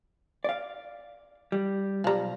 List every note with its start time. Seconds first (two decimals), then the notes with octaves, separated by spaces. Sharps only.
0.44 D5 F5
1.52 G3
2.04 B1 F3 G3 A#5